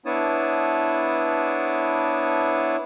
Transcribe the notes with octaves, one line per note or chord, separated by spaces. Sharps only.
B3 D4 E4 C#5 A5 D#6